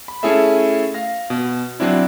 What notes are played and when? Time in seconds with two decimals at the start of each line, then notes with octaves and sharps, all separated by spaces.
0.08 B5
0.23 A3 C#4 E4 G#4 A4 E5
0.94 F5 A#6
1.30 B2
1.80 F#3 C4 D4 E4